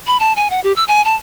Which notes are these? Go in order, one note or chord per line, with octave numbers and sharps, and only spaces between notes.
B5
A5
G#5
F#5
G4
E6
G#5
A5